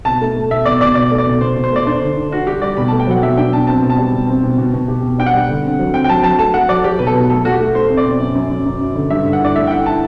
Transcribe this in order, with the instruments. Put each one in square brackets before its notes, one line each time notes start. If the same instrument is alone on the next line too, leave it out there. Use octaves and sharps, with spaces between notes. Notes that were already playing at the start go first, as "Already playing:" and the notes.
[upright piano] B2 [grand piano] A5
[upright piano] A3
A3
[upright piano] B2 [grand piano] E5
[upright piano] B2 [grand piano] D5
[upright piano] B2 [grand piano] D5
[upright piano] B2 [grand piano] D5
[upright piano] A3
[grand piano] D5
[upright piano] B2
[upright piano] B2 [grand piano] C5
[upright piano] B2
[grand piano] C5
[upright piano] A3 [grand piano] D5
[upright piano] D4 [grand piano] C5
[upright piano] D3
D4
[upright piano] D4 [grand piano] F#4
[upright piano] G3 [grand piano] G4
[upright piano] G3 [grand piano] D5
[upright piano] B2 [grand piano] B5
[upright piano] A3 [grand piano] A5
[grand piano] G5
[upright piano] F#3 [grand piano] F#5
[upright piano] B2 [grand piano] E5
[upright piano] D4 [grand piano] G5
[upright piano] B2 [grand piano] A5
[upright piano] C4 [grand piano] A5
[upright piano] B2
[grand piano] A5
[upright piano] G3
B2
C4
B2
B2
B2
G4
B2
[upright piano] D4 [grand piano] G5
[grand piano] F#5
[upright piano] G3
D3
C4
F#3
[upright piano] C4 [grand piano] G5
[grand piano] G5
[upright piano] F#3 [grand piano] A5
[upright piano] F#3 [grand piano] A5
[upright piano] A3 [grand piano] A5
[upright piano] A3 [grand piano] F#5
[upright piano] F#3 [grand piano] D5
[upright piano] F#3 [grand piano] G4
[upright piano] B2 [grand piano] B4
[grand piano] A4
[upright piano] B2
[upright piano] A3 [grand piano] A4
[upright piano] A3 [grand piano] F#4
[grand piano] G4
[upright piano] A3
[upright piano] A3 [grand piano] C5
[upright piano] C4
[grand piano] D5
[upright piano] B2
F#2
F#2
F#2
F#2
F#2
D3
[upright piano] G2 [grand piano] E5
[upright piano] D3
[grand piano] F#5
[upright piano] E4 [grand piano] D5
[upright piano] A3 [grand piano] E5
[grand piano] G5
[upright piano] E4 [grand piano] F#5
[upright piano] E4 [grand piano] A5